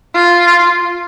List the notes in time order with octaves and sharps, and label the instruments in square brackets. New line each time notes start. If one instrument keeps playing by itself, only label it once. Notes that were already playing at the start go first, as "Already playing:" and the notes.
[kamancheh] F4